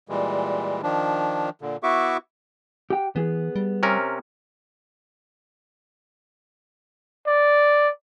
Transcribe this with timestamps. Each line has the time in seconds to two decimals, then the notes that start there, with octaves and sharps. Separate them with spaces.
0.09 A#2 E3 G3 G#3
0.83 D#3 F3 D4
1.62 A#2 D3
1.83 B3 E4 F#4 E5 C#6 D6
2.90 G4 F#5 G5
3.16 E3 B3 G#4
3.56 G3
3.83 C3 C#4 A#4
7.27 D5